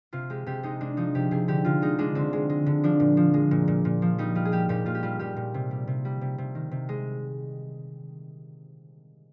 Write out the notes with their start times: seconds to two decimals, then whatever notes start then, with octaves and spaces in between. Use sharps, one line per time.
0.13 C3 F4
0.30 G#3 G4
0.46 C3 G4
0.63 G#3 D#4
0.81 G#3 D4
0.97 F3 D#4
1.15 C3 G4
1.31 C3 G#4
1.48 D3 G4
1.65 D3 F4
1.82 G#3 D#4
1.99 G#3 D4
2.15 D3 C4
2.33 G#3
2.49 G#3
2.66 D3
2.84 F3 D4
3.00 A#2
3.17 F3
3.34 G#3
3.51 A#2
3.68 A#2
3.85 A#2
4.02 F3
4.18 G3 D#4
4.35 G3 F4
4.45 G#4
4.52 G3 G4
4.69 A#2 G4
4.86 A#2 F4
4.95 G4
5.03 G3 F4
5.19 A#2 G4
5.36 A#2
5.54 C3
5.71 G3
5.87 C3
6.05 G3
6.21 C3
6.38 C3
6.55 D#3
6.71 C3
6.89 G#3